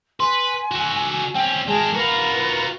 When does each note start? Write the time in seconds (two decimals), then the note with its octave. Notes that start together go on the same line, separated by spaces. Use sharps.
0.20 B4 G#5 C6
0.71 F#4 A4
1.35 C4 C#4 G5
1.68 G#3 G#4 A#4 A5
1.94 F4 F#4 A#4 B4 A#5